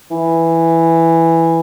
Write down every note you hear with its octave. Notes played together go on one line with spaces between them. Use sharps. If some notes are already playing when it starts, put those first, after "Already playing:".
E3